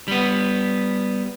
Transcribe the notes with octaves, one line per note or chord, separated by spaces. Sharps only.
G3 B3